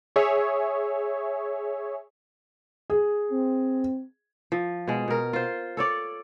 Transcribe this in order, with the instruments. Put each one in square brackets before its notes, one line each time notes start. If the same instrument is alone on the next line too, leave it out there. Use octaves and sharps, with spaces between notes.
[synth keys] G#4 C#5 E5
[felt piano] G#4
[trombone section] C4
[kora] F3
B2 G#3
B2 A#4
F4 C5
A4 C#5 D5